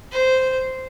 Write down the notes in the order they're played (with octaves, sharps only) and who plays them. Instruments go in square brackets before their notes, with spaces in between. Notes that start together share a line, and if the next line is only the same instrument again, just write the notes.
[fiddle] C5